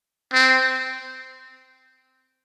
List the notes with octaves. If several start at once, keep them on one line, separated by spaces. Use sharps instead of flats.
C4